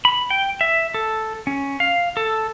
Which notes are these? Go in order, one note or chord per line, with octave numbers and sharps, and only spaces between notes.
B5
G5
E5
A4
C#4
F5
A4